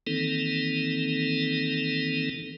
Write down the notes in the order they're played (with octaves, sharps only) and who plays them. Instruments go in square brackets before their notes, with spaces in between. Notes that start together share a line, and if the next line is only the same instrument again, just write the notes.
[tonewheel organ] D#3 E3 A#3 C4 D#4 A4